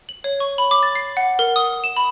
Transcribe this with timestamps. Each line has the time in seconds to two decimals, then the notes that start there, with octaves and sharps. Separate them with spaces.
0.09 F#7
0.24 C#5
0.40 C#6
0.58 B5
0.71 D6
0.83 A6
0.95 C7
1.17 F#5
1.39 A#4
1.56 D#6
1.84 E7
1.97 B5